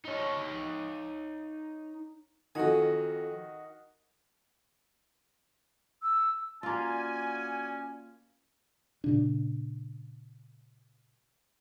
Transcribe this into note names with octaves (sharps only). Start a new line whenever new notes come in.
D#4 C#5
F2 D#3 D#4 F#4 G#5
E6
A#3 C#4 F4 F#4 D5 G#5
A#2 C#3 D4